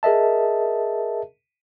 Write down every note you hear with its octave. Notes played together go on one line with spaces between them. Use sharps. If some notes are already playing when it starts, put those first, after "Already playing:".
G#4 A#4 D#5 E5 A5